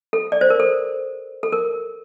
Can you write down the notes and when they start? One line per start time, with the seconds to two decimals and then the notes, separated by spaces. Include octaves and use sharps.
0.13 A4
0.32 D5
0.41 C5
0.50 A#4
0.60 A4
1.43 A4
1.52 A#4